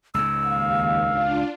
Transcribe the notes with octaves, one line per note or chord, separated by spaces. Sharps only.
C#2 G#2 E6
D#2 F5
D4 F4